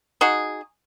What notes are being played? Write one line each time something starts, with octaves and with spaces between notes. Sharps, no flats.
D#4 F#4 G#4